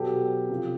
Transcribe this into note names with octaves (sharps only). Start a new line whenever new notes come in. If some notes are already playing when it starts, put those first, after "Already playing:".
Already playing: B2 F#3 G4 A4
C3 F3